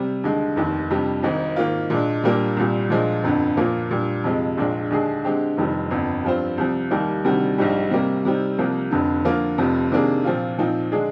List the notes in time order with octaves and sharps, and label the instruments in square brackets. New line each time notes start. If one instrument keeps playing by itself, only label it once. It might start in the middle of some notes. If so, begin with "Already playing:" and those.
Already playing: [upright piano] C3 G3
D#2 D3 G#3
F1 D#2 D#3
F2 C3 G3 D4 G4
G#1 G#2 D#3
G#2 D#3 A#3 F4
A#2 G#3 D4
A#2 G3 A#3 D4
C2 A#2 G3
A#2 F3 G#3 D4
G1 F2 D3
A#2 F3 A#3 F4
A#2 G3 D4
F2 C3 F3 G#3
A#1 A#2 G#3 D4
D#2 D3 G#3 D4 G#4
D3 G#3 C4 G4
F1 F2 C3 D#3 G3
G1 F2 D3
G2 F3 C4 F4 C5
C2 C3 F3
D#2 D#3 G3 A#3
D2 C3 D#3 G3
A#1 G#2 G3
C3 G3 A#3
C3 G3 C4 D#4
C2 C3 F3 A#3
F1 F2 D3
D3 F3 A#3 F4
F1 F2 C3 F3
C3 D#3 A#3 D4 G#4
A#2 F3 C4 F4
A#2 F3 C4 D#4
D3 G#3 D4 G#4